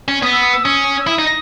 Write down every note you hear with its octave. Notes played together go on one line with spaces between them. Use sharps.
C#4
B3 D#6
E6
D#6
E6
C#4 D#6
E6
E4 D#6
D#4